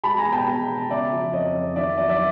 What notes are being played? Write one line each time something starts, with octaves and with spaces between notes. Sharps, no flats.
G#3 A5 B5
G#5 A#5
B2
G5 A5
G#3
B2
C#3 D5 E5
F3
F2 C#5 D#5
F2
D#3 D5 E5
F#3 D5 E5
D5 E5